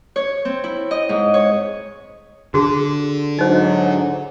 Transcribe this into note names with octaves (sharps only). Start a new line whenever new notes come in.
C#5
C4
E4
D#5
G#2
C#5
D3 F#4 G#4
G#2 F#3 D#4 C5